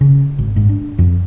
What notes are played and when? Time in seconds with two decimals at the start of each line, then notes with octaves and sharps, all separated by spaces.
0.01 C#3
0.38 G#1
0.56 G#2
0.69 D4
0.99 F2